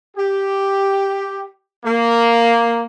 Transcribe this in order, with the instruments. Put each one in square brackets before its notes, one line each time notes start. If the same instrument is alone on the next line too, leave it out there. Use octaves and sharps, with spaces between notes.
[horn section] G4
A#3